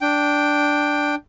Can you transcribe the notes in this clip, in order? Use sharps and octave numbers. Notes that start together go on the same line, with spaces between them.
D4 G5